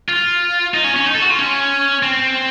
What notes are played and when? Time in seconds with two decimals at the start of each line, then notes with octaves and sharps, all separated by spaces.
0.09 F4
0.74 D#4
0.84 C#4
0.96 C#4
1.06 D#4
1.15 A4
1.22 F#4
1.30 F4
1.39 C#4
2.03 C4